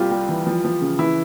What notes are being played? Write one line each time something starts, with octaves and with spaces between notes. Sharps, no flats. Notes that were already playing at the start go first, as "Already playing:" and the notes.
Already playing: C2 G3 F4 G4
G3
E3
F3
F3
C#3
E3 E4